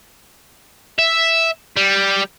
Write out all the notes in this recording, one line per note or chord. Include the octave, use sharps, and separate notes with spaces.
E5
G3